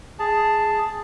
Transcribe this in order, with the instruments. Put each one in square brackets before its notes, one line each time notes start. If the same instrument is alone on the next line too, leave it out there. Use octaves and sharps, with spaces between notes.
[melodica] G#4 A5